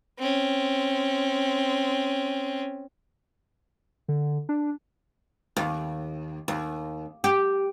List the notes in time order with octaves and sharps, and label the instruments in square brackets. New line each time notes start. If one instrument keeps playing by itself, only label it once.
[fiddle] C4 C#4
[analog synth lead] D3
D4
[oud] D#2
D#2
G4